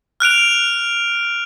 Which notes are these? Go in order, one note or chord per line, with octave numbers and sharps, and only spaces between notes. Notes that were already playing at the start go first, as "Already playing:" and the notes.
F6 F#6 D7 F7